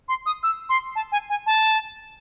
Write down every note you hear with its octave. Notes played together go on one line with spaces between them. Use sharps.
C6
D#6
E6
C6
A5
G#5
G#5
A5